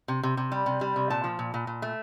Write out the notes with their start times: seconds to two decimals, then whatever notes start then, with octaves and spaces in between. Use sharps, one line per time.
0.08 C3
0.23 C3
0.37 C3
0.52 G3
0.66 C3
0.81 G3
0.96 C3
1.10 A#2 A5
1.24 F3
1.39 A#2
1.54 A#2
1.67 A#2
1.82 A3